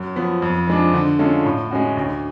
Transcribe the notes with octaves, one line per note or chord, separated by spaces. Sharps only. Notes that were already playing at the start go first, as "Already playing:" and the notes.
Already playing: F#2
F3 B3
F2
F3 G#3 D4
D3
G#3 C#4 F4 A4
A2
G#3 C#4 F#4
D2